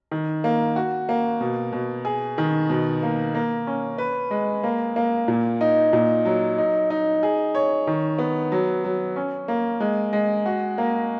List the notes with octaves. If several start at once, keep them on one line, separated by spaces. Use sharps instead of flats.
D#3
A#3
F#4
A#3
B2
B2
G#4
D#3
B2
A#3
A#3
C#4
B4
G#3
A#3
A#3
A#2
D#4
A#2
F#3
D#4
D#4
G#4
C#5
D#3
B3
F#3
F#3
C#4
A#3
G#3
G#3
F#4
A#3